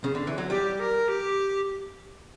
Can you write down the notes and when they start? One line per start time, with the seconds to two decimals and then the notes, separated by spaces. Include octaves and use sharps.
0.04 C#3
0.15 D3
0.27 E3
0.38 F#3
0.50 G3 G4
0.80 A#4
1.08 G4